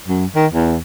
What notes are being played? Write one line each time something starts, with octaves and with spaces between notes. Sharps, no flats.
F#2
D#3
E2